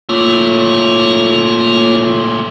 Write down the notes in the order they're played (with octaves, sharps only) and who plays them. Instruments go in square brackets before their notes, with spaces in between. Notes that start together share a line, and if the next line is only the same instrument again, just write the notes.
[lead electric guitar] A#2 A3 [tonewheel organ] A#3 F4 C#5